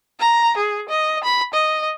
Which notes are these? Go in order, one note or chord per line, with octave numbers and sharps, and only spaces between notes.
A#5
G#4
D#5
B5
D#5